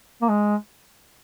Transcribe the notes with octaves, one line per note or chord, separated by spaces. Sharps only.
A#3
G#3